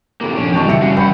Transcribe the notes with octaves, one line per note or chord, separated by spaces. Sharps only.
C3 E3 A#3 G4 A4
A#1 C3 C#4 D4
A1 D#3 F#4 G4 A5 C#6
F#1 G3 E5 C#7
C#4 F#4 F5
E3 F#5 G5 B5 G6